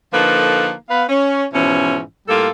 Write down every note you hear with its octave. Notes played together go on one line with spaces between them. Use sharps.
D3 F3 A#3 D#4 A4 B4
B3 B4 F5
C#4
G#2 B2 E3 F3 C#4
A2 G3 A#3 F4 A4